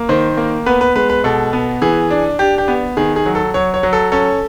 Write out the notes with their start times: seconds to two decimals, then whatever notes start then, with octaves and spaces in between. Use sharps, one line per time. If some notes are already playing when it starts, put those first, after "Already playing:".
Already playing: A#3
0.09 D#3 C5
0.37 A#3
0.66 B3 B4
0.81 B4
0.95 G#3 B4
1.10 B4
1.24 B2 A4
1.53 B3
1.82 E3 G#4
2.10 D4
2.39 D4 G4
2.58 G4
2.68 B3
2.97 D#3 G#4
3.16 G#4
3.26 F#3
3.35 A4
3.54 F#3 C#5
3.74 C#5
3.83 F#3
3.93 A4
4.12 C#4 A4